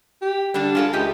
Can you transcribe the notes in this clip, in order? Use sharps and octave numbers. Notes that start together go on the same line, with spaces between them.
G4
D3 G3 D4
G#3 F4 A4
C#2 A3 G4 D#5